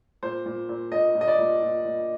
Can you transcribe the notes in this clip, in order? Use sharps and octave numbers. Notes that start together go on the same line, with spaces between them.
A#2 C5
A#2
A#2
A#2 D#5
A#2
D#5
D5
A#2
A#2
A#2